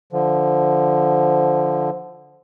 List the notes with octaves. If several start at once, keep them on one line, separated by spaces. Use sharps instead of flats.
D3 F3